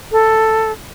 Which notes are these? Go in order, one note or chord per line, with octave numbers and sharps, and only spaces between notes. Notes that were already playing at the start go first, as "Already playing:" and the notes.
A4